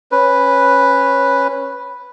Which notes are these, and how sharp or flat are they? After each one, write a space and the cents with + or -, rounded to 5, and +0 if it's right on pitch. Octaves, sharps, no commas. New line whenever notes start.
C#4 -15 B4 +0